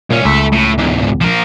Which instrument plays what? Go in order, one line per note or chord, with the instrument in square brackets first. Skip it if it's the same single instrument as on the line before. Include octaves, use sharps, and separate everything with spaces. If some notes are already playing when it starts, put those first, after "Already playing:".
[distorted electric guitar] C2 C#4 [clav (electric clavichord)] A#2
[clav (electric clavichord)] C#2 [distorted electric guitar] A4 E5
[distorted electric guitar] A2
E2 G#2
F3 A#4